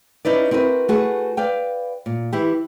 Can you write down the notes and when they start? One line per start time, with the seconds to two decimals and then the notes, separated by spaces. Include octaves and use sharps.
0.25 C#4 D#4 E4 B4 D5
0.51 C4 E4 F#4 A#4 B4
0.88 A3 F#4 G#4 B4
1.37 B4 D5 F5 G5
2.06 A#2
2.33 E3 E4 G4